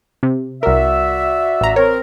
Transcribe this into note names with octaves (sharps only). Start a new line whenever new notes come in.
C3
C2 F#4 A#4 D5 E5
A1 A#5
C4 A#4 C#5